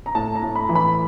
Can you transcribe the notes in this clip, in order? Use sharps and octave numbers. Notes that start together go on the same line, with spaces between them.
A#5
A2 A5
A#5
A2
B5
E3
B5